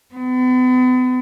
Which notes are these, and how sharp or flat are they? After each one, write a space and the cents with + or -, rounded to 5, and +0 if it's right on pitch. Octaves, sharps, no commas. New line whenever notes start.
B3 +40